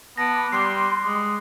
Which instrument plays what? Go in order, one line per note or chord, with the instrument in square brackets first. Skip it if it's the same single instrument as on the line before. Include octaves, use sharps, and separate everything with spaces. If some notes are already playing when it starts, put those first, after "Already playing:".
[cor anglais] B3 [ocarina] A5 [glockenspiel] A#6 D7
[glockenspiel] B5 D6
[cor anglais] G3 [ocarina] C6 [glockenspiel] F#6 C7
[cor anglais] G#3